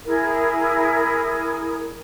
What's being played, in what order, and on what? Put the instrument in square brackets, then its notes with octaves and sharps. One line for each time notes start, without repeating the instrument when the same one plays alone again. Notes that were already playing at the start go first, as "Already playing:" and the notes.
[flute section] E4 G#4 A#4